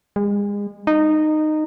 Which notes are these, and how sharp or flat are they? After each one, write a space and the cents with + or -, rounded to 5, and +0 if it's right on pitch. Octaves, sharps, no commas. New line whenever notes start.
G#3 -35
D#4 -15